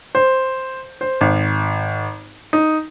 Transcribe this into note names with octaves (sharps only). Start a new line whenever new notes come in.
C5
C5
G#1
D#4